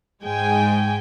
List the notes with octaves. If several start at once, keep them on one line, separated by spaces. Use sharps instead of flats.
G#2 G#3 G5 G#5